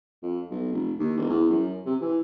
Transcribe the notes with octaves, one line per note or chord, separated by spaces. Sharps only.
F2
B1
F1
D#2
E1
E2
F#2
C3
E3